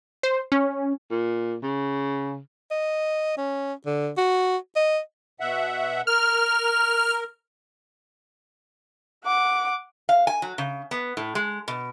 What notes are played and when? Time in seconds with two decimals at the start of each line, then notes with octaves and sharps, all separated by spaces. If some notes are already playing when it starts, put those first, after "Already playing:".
0.23 C5
0.52 C#4
1.11 A#2
1.63 C#3
2.71 D#5
3.38 C#4
3.86 D3
4.17 F#4
4.76 D#5
5.40 B2 E5 F#5
6.07 A#4 F6
9.24 F#5 D6
10.09 F5
10.27 G#5
10.42 F#3
10.58 C#3
10.91 B3
11.17 A2
11.35 G#3
11.68 B2